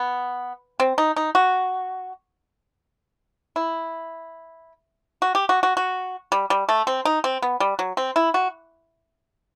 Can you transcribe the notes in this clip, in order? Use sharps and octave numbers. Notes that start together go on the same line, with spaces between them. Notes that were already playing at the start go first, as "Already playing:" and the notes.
Already playing: B3
C4
D#4
D#4
F#4
E4
F#4
G4
F#4
F#4
F#4
G3
G3
A3
C4
D#4
C4
B3
G3
F#3
C4
E4
F#4